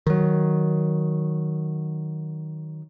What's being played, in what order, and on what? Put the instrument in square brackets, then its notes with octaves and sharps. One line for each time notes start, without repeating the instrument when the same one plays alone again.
[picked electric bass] D#3 F#3